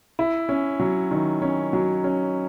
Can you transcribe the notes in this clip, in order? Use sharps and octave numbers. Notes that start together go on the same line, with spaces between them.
E4
C#4
F#3
D#3
C#4
F#3
C#4